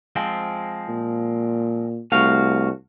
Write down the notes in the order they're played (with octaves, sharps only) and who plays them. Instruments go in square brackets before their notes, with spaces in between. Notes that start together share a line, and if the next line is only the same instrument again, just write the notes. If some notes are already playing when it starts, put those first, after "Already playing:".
[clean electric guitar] F3 G#3 C4
[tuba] A#2
[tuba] C2 [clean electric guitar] A3 F#4 F5